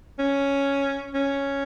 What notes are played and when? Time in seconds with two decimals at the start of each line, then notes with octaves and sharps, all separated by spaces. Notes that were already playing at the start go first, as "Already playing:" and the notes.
0.19 C#4
1.14 C#4